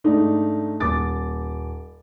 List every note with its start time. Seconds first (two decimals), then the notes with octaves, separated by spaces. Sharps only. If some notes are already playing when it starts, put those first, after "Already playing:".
0.04 G#2 A3 D4 D#4
0.80 D#1 D6 A6